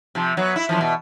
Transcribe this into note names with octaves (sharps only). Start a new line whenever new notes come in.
C3 F3
F#3 B3
E4
F#2 E3 F3
E2 B2